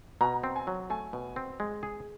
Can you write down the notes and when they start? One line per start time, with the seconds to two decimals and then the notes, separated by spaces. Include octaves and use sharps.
0.21 B2 A#5
0.44 C4
0.56 G#5
0.67 F#3
0.90 A3 G#5
1.13 B2
1.36 C4
1.60 G#3
1.83 G#4